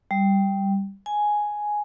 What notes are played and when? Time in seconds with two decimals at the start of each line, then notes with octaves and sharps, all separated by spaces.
0.11 G3
1.06 G#5